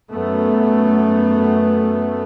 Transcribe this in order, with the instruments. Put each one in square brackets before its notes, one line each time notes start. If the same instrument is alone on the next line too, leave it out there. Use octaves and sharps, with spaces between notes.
[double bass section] F#2 A3 B3